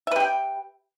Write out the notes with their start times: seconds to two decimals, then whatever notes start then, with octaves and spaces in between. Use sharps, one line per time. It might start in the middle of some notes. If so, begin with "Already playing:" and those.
0.07 E5
0.11 B4
0.16 G4
0.20 G5